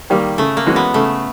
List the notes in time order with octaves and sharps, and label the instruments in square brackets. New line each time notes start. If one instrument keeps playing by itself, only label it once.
[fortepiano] D#3 G3 A#3
[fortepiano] C#3 [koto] A3
[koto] A#3
[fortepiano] E3 G#3 C#4 F#4
[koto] B3
[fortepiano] C#3 [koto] A3